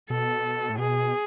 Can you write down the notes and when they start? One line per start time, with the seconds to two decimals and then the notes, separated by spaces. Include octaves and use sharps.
0.10 B2 A4
0.70 A2
0.78 B2 G#4